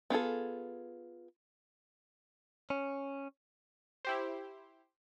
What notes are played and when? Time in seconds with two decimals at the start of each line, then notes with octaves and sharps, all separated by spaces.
0.10 B3 F4 G#4 A4
2.70 C#4
4.05 E4 G4 C5